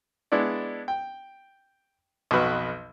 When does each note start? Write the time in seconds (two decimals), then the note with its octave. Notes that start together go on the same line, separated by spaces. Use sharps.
0.32 G#3 B3 D4 E4 D5
0.88 G5
2.31 B1 F2 F#4 B4 F6